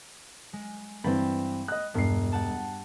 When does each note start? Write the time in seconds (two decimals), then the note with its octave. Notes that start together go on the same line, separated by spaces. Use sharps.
0.53 G#3
1.04 G2 E3 C4 G5 B5 A6
1.68 D#5 F#6
1.94 E1 G2 C7
2.32 G4 F#5 A5